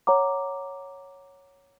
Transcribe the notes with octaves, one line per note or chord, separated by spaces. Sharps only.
C#5 F#5 A#5 D6